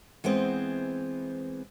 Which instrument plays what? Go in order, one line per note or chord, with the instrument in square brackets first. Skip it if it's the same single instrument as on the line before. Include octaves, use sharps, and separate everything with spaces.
[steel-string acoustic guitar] E3 G#3 B3 C4 C5